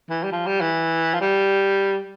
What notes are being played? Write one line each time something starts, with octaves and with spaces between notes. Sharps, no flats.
E3
G3
F3
G3
E3
F3
G3